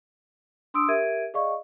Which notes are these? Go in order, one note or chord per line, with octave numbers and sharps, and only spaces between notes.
D4 C6 D#6 E6 D7
G4 A#4 E5 G#6 D7 D#7
G#4 D5 D#5 F5 C#6